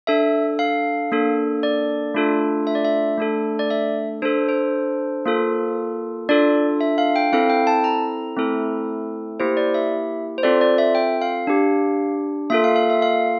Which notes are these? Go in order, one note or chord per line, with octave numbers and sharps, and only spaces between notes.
D4 A4 E5
F5
A#3 D4 A4
D5
A3 D4 F4 A4
E5
D5
E5
A3 D4 A4
D5
E5
D4 A4 C5
C5
A#3 F4 A4
D4 F4 A4 D5
E5
F5
G5
C4 E4 A4 F5
G5
A5
A#5
A3 C4 E4 A4
A#3 E4 G4 C5
D5
E5
C5
C4 F4 A4 D5
D5
E5
G5
F5
D4 G4
A#3 F4 A4 E5
F5
F5
E5
F5